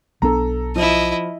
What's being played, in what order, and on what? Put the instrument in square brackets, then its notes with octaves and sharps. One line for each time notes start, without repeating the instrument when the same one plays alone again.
[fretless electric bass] B1 B3 D4 [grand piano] A4 A#5
[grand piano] F3 [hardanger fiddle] E4 D#5